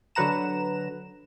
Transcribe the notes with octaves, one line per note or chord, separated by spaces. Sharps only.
D3 F#3 B4 F#5 A#5 E7